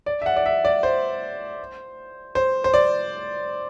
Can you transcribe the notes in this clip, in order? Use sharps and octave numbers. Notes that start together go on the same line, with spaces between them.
D5
E5
F#5
D5
E5
D5
C5
C5
C5
D5